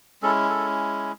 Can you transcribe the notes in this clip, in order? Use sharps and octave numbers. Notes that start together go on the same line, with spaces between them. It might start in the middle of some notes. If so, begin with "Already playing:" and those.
G#3 C#4 E4 A4
A4